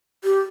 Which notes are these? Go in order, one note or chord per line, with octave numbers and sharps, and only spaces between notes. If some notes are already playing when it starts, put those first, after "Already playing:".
G4